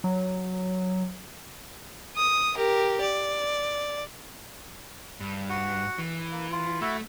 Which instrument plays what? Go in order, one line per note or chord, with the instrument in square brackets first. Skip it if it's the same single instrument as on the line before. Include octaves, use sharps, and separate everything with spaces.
[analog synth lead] F#3
[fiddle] D#6
G4 A#4
D5
[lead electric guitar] G2
[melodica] F#4 F#5
[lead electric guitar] E3
[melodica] A#3
F4
[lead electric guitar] A3 [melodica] E4 F#4 E5